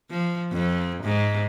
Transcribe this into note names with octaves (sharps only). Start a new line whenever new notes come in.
F3
F2
G#2